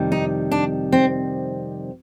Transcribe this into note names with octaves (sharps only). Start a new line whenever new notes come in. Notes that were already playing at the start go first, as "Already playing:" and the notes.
Already playing: F2 C3 D#3 G3
D#4
D4
C4